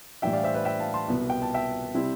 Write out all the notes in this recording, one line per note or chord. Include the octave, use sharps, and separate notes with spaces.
A2 E3 G3 D4 E5 G5
D5 F5
C5 E5
B4 D5
E5 G5
F5 A5
A5 C6
C2 B2 B3
G5
A5
E5 G5
C3 G3 C4 E4